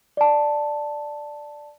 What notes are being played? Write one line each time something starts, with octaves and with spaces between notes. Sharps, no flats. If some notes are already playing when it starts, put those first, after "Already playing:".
D5 A5